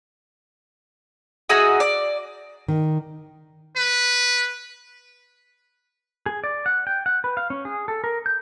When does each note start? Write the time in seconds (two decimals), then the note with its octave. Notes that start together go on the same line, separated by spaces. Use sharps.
1.49 D#4 F#4 G#4 E5
1.80 D5
2.68 D#3
3.76 B4
6.26 G#4
6.44 D5
6.66 F#5
6.87 G5
7.06 F#5
7.24 B4
7.37 F5
7.50 C#4
7.65 G#4
7.88 A4
8.04 A#4
8.26 G6